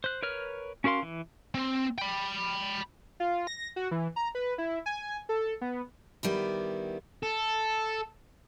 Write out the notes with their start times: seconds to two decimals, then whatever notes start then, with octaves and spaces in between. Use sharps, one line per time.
0.04 C5 F#6
0.23 A#4 B4 C#5 F6
0.84 C#4 F#4 A#4 F5 C6
1.03 E3
1.55 C4
1.98 G5 B5
3.20 F4
3.47 A#6
3.76 F#4
3.91 E3
4.16 A#5
4.35 B4
4.58 E4
4.86 G#5
5.29 A4
5.61 B3
6.23 D#3 G3 B3 E4
7.23 A4